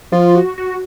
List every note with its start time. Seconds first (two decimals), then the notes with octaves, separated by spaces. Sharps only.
0.12 F3 F4
0.35 F#4
0.58 F#4